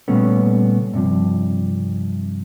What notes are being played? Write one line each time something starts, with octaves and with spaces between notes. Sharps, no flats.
A#2 C#3 G3 A3 B3 C#4
G2 C3 F3